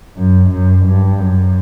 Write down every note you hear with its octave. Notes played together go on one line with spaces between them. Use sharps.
F#2
F#2
G2
F#2